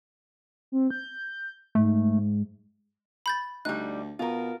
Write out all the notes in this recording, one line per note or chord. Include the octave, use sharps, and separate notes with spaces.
C4
G6
G#2 A3
B5 G6 A6
D2 G3 D#4 F#6
B2 F4 A#4